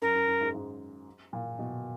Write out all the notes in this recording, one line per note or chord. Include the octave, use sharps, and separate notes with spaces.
F#2 A#4
F#2
F#2
G#2
G#2
A#2
B2